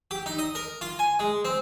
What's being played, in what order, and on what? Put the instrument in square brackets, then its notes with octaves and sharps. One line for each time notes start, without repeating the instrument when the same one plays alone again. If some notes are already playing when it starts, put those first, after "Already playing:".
[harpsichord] G4
D#4
D#5
A#4
F4
G#5
G#3
C4